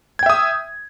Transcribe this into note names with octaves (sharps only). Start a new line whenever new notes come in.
E5 G5 D#6 G#6